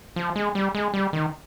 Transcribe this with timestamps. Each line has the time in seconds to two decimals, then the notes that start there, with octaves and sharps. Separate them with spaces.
0.16 F3
0.36 G#3
0.55 G3
0.75 G#3
0.94 G3
1.13 D#3